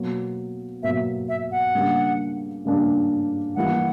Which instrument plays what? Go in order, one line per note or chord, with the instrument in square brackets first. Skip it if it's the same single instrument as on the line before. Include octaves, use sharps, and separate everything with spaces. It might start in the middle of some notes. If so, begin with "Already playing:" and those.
Already playing: [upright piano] B2 F#3 A#3
[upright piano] B2 F#3 A#3 [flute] E5
[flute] E5
F#5
[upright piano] C#3 G3 A#3 D4
C#3 G3 A#3 D4
[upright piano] E3 G3 A#3 E4 [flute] F#5